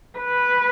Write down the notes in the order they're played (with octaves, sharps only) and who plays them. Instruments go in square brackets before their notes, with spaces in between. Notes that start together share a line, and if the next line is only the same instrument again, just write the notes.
[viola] B4